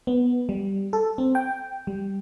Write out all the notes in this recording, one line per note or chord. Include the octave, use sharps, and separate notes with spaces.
B3
G3
A4
C4
G5
G3